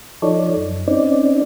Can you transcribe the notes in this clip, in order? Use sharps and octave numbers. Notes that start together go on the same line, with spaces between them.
F3 D#4 A4 C#5 D5
F#2
C4 C#4 D#4 D5